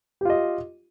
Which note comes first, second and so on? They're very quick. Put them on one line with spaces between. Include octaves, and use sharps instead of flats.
G4 F4 D#5